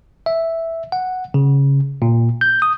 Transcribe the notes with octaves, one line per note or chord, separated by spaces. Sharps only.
E5
F#5
C#3
A#2
G6
D#6